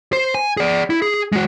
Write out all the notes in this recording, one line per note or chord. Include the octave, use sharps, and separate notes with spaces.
C5
G#5
G#4 D5
E4
G#4
G#3 F#4